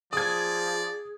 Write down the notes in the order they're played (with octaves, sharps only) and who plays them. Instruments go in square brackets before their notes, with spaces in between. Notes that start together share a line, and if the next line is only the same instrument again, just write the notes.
[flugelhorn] F3 [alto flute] G#4 [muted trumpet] D5 [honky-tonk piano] D#6 G#6